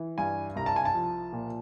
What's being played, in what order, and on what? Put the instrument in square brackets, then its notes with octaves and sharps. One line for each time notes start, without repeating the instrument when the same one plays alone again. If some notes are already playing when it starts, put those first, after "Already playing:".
Already playing: [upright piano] E3
G2 G#5
C2 A#5
A5
G#5
A5
F3
A#2